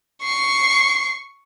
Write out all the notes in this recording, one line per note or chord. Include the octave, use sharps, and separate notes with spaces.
C#6 C7